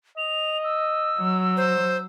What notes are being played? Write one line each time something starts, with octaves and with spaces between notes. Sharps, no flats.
D#5 F7
E6
F#3
C5